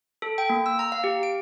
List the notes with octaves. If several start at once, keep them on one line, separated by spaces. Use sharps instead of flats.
A4
G5
A#3
E6
A#5
F5
G4
D7